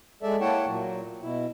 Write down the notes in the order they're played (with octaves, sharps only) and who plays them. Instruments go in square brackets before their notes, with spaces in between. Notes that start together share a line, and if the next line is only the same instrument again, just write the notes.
[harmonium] G#3 A4 D5 E5
A#3 E4 C#5 F#5 G5 A5
A#2 F#3
B2 E4